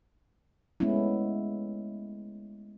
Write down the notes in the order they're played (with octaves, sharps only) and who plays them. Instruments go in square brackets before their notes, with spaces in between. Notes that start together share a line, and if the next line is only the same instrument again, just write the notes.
[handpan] G#3 A3 B3 C#4 E4